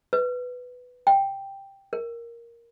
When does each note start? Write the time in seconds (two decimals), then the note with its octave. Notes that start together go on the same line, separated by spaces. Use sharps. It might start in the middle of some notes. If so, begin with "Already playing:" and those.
0.13 B4
1.07 G5
1.93 A#4